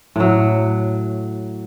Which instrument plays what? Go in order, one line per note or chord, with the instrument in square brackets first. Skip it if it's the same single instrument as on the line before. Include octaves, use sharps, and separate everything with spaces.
[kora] A2 F#3